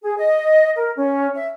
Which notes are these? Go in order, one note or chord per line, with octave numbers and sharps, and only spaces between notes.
G#4
D#5
A#4
C#4
E5